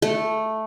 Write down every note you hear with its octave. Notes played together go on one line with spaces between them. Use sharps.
A3